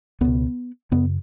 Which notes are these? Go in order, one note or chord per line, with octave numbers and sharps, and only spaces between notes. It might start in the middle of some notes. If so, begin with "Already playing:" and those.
C#2 B2 B3
F#2 C#3 B3